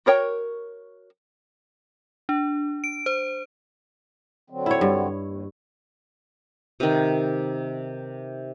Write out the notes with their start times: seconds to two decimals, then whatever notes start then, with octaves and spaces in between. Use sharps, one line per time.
0.06 F#4 A#4 C#5 G5
2.29 D4
2.84 D7
3.06 C5
4.50 D3 F#3 C4
4.66 E4 C#5
4.81 G2
5.22 D#2
6.80 C3 D#3